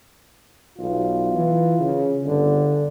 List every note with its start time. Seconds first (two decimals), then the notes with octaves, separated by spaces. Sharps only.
0.78 B1 F4
1.34 E3
1.79 C#3
2.25 G1 D3